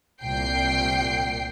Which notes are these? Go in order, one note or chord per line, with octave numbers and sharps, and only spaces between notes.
C2 A#2 G5 C7